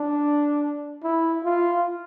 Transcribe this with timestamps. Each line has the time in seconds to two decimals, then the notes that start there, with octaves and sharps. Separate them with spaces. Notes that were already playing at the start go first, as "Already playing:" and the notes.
Already playing: D4
1.03 E4
1.44 F4